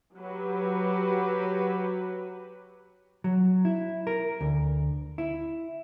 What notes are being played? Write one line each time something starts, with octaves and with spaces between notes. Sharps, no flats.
F#3 F#4 G4 B4
F#3
E4
A#4
D2
E4